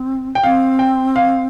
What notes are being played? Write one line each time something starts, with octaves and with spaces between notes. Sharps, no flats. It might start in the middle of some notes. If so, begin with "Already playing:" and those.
Already playing: C4
G5
C4 F5
G5
F5